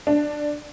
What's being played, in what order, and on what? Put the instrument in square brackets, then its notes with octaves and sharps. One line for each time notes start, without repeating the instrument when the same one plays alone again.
[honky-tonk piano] D4